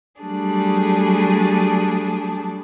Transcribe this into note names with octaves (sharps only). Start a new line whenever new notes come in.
F#3 G3 A3 D4 G#4